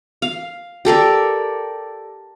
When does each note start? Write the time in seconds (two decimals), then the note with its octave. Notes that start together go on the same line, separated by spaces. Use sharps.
0.22 F5
0.85 G4 A4 A#4 D5